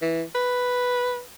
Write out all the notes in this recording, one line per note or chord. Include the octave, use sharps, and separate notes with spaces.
E3
B4